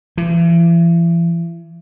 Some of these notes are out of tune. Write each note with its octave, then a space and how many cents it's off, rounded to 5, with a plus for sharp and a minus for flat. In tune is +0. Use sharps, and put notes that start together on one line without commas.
E3 +40